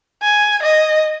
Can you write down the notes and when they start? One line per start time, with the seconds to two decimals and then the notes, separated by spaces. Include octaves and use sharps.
0.22 G#5
0.62 D#5